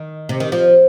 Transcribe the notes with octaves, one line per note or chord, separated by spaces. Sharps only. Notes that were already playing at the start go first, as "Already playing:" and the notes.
Already playing: D#3
C3
D#3
F3